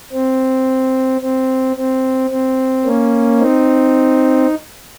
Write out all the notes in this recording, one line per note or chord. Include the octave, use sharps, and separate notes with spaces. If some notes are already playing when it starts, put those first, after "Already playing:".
C4
C4
C4
C4
A#3 C#4
C4 D#4